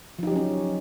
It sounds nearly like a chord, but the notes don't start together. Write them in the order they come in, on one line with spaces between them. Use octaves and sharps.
F3 D#4 G4 F#3 C#4